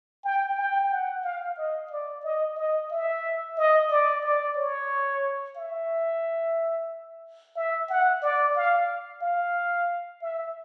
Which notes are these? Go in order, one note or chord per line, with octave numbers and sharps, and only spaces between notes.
G5
G5
F#5
F5
D#5
D5
D#5
D#5
E5
D#5
D5
D5
C#5
E5
E5
F#5
D5
F5
F5
E5